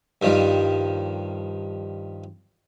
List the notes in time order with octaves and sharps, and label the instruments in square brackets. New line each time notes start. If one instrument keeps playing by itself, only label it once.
[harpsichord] G2 D#3 F3 G3